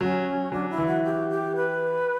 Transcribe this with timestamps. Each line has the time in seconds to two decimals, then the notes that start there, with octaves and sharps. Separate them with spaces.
0.01 F#3 C#4
0.52 F#3 D4
0.70 E4
0.78 E3
0.87 F#4
1.04 G4
1.30 G4
1.56 B4